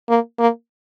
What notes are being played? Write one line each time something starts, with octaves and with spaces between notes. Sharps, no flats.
A#3
A#3